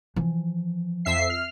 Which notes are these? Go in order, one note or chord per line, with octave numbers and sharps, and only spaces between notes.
E3 F3
F2 E5 C7
F6